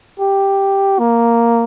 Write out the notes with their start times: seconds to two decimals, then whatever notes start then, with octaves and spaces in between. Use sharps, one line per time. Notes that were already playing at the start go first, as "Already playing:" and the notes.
0.20 G4
0.99 A#3